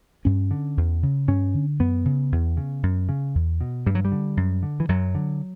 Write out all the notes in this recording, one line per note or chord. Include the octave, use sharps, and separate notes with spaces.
G2 C#4
D3
E2
C#3
G2 C#4
D3
F#2 B3
C#3
E2
C#3
F#2
C#3
E2
B2
G2 G3
F#3
G3
D3
F#2
D3
E3
F#2 F#3
D3